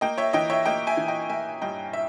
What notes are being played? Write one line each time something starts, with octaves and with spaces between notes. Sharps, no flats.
A#3 D#5 G5
C#5 E5
E3 D#5 G5
C#5 E5
A#3 D#5 G5
E5 G#5
E3
D#5 G5
A#3 E5 G#5
G2 D#5 G5
E5